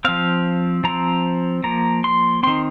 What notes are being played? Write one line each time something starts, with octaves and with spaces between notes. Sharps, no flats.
F3 C4 F5
F3 C4 A#5
F3 A#3 A#5
C6
D#3 C4 C6